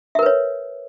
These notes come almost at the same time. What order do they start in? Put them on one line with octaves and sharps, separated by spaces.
E5 A#4 B4 C#5